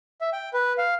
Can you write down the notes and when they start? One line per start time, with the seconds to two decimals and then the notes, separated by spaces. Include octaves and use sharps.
0.21 E5
0.33 G5
0.53 B4
0.78 F5